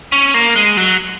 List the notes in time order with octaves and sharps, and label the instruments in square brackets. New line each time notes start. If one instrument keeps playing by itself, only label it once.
[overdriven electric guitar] C#4
A#3
G#3
F#3